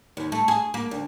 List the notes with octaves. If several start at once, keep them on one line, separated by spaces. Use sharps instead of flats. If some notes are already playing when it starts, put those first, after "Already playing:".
D#2
A3
G#4
A#3
D2